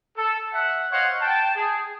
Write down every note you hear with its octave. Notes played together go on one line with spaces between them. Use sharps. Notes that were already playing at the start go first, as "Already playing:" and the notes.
A4
E5 F#5
C5 C#5 D#5 F5 F#5
G5 A5
G#4